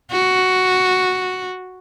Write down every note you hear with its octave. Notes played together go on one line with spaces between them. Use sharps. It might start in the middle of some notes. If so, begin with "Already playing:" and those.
F#4